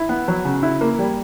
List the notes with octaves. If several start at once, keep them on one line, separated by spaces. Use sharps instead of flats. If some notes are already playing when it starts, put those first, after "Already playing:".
Already playing: E4
B3
F#3
C#3
E4
A#3
G3